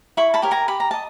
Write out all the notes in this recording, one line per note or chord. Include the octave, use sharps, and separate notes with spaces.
E4 B5 C#6
A5 B5
G4 A#4 C#5
G#5 A#5
G4 B5
A#5
D#5 A5